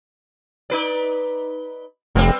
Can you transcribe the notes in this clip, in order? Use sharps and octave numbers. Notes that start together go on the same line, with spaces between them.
D#4 B4 D5
F1 G3 B3 C4